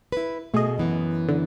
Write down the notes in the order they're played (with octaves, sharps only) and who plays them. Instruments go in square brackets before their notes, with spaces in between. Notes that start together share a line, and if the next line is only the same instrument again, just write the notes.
[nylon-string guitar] E4 B4
[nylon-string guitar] B2 G#4 [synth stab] A3 D#5
[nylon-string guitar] F#2 E3 B3
[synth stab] D3